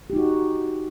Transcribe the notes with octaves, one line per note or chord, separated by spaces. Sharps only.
D#4 F#4 G4